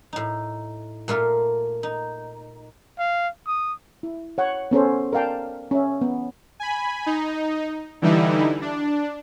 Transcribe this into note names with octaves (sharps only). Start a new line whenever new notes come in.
A2 D#4
A#2 A3 F4 A#4
D#4
F5
D#6
E4
C#5 F#5
B3 C#4 A4 C5
A#4 D5 F5 G5 A5
C#4 E5
B3
G#5 B5
D#4
D3 E3 G3 D#4 E4
D4